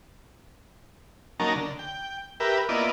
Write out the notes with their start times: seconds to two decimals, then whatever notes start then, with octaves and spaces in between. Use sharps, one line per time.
1.40 F#3 A#3 C#4 D#4 A5 A#5
1.55 D3
1.79 G5
2.40 G4 A#4 B4 E5
2.69 A#3 B3 E4 F4 D5 D#5